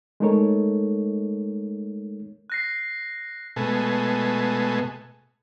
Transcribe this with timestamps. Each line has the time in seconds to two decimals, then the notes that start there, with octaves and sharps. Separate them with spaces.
0.20 G#3 A3 D#4 A4 A#4 C#5
2.50 F#6 A#6 C7
3.56 B2 G#3 A3